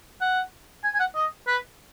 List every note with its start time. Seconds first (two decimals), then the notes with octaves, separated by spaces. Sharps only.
0.21 F#5
0.84 G#5
0.94 G#5
1.00 F#5
1.15 D#5
1.47 B4